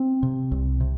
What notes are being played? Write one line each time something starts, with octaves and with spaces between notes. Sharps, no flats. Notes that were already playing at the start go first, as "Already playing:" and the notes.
Already playing: C4
C3
C2
C3